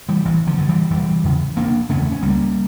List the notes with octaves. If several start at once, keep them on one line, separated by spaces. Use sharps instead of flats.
E3 G3
A1 E3
D3 F3
G2 D3
E3 G3
E1 E3 G3
E2 C#3
E1 A#3 D4
E2 C#3 A3 C#4
C#4
C#2 G3 A#3